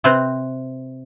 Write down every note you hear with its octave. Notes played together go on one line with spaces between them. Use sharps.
C3 C4 B4 C5